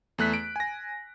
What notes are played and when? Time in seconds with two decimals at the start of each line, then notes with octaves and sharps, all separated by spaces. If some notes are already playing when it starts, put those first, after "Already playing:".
0.18 E2 A3 F#6 B6
0.34 D7
0.56 G#5 A#6